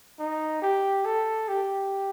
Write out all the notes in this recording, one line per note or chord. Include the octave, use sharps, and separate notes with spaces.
D#4
G4
A4
G4